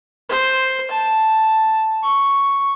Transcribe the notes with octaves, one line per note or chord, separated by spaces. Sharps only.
C5
A5
C#6